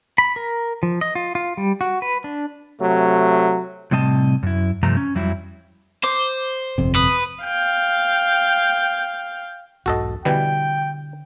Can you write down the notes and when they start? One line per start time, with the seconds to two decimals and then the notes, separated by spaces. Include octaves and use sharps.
0.18 B5
0.36 A#4
0.83 F3
1.01 D#5
1.15 F4
1.35 F4
1.57 G3
1.81 F#4
2.02 B4
2.24 D4
2.80 C3 F#3 A3
3.91 A2 C3 G3 C4 D#5 A5
4.43 F#2 E4
4.83 G2 C3 F3 A3 A#5
4.97 C#4
5.15 F2 F#3 G3 E4
6.03 C5 D6
6.78 G1 F2 C3
6.95 B4 D#6
7.44 F5 G5
9.86 B1 E2 G#2 F#4 A4 D#5
10.25 B2 D3 E3 G3 G5